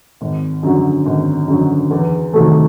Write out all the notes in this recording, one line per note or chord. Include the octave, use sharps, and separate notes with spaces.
G#1
F#2 D3 F#3
G#1
F#2 D3 F#3
E2
C3 D#3 F#3 A3